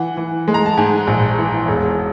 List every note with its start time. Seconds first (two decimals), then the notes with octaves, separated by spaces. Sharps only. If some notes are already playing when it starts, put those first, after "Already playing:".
Already playing: E3 F#5
0.17 E3
0.48 G#3
0.54 A#5
0.66 A5
0.77 G#2 G#5
1.07 A#1
1.38 E3
1.68 E1